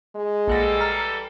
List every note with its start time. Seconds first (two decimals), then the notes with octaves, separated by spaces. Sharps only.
0.16 G#3
0.47 A#1 E3 G3 A4 F#5 A#6
0.81 A#5 F6